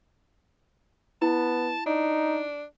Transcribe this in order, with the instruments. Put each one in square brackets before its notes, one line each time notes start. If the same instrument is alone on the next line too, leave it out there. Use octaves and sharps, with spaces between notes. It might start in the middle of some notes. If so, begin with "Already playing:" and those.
[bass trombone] B3 [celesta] E4 [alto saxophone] A5
[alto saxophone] D4 [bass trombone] D#4